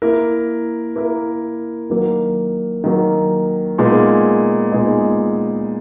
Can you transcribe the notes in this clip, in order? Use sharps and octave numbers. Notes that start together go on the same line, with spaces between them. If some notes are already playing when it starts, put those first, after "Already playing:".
A#3 E4 A#4
A#3 E4 A#4
D#3 F#3 A#3
D#3 F#3 A#3
A#2 G#3 B3 D#4 G#4
A#2 G#3 B3 D#4 G#4